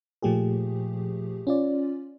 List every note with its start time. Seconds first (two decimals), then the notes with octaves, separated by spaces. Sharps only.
0.22 A#2 F3 A3 G4 G#4
1.47 C#4 F4 D5